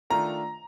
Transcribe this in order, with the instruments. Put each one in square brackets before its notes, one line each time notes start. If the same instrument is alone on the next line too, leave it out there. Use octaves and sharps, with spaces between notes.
[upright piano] D#3 A3 D4 F4 [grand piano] A#5